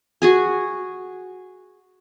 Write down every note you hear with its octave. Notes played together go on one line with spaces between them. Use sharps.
F#4 G#4 G#5